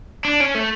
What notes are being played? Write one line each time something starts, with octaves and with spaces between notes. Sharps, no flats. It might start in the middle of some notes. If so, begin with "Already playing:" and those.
D4
C#4
A3